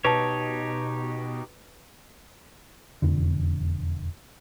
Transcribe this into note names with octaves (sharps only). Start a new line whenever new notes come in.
B2 D#4 G4 B4 C#5 A5
E1 F2 D3